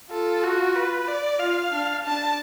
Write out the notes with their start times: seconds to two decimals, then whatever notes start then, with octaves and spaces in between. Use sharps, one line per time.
0.11 F4 A4
0.44 F#4
0.76 B4
1.08 D5
1.40 F4 F5
1.72 D4
2.04 D4 A5